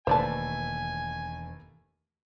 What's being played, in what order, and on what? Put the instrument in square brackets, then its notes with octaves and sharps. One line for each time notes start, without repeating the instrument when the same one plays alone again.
[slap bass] E1 [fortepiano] D#2 A3 B4 [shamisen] C5 D5 A5 [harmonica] G#5